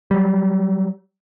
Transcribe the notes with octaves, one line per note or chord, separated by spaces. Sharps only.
F#3 G3